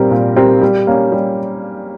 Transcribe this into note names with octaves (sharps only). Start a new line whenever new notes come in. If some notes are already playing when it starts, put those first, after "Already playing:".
Already playing: A#2 G3 C4 G4 A#4
A#2
G3 C4 G4 A#4
G3
A#3 C#4
G3